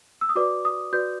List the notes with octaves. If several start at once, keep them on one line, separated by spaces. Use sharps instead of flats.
E6
D#6
F#4 B4 D5 D6
D#6
F#4 B4 D5 G6